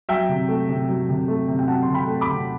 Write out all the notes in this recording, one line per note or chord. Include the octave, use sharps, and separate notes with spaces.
F#3 E5 G5
C3
A3
C3
F#3
C3
A3
C3
G5
F#3 F#5 A5
C6
C3
G5 B5
A3
B5 D6
C3